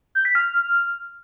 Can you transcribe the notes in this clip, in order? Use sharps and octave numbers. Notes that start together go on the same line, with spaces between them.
G6
B6
F6